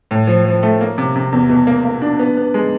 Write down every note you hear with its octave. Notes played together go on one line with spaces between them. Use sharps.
A2
F3
F3
A3
A#3
C3
C3
E2
B2
A#3
A#3
D4
B3
B3
G#3